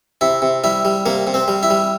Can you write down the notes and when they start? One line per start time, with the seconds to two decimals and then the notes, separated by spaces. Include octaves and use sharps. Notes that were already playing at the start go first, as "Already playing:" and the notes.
0.21 C3 E4
0.42 C3
0.64 G3 E4
0.85 G3
1.06 C3 A#3
1.27 C3
1.34 C4
1.48 G3
1.63 E4
1.70 G3